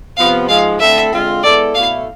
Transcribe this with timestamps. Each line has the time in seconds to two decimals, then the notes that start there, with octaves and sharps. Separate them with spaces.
0.17 C3 F3 B3 F5
0.48 G#2 F3 G#3 F5
0.80 D3 A3 C4 E4 A4 E5
1.11 D3 G#3 C4 F4
1.43 G#3 B3 E4 A4 D5
1.75 B2 A3 E4 F5